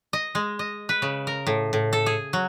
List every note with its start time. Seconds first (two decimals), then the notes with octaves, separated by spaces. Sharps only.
0.13 D#5
0.35 G#3
0.59 D#5
0.89 B4
1.02 C#3
1.27 A#4
1.47 A2
1.73 A2
1.93 A4
2.06 G#4
2.33 F#3